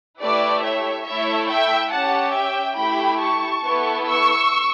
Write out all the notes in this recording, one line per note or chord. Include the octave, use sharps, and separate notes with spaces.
A3 E4 G4 B4 D5
C#5 E5
A3 E4 A4 C#5 E5
E5 G5
C#4 G4 F#5 A5
E5 G5
A3 E4 G4 G5 B5
A5 C#6
B3 E4 A4
C#6 E6